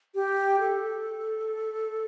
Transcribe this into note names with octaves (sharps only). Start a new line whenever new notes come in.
G4
A4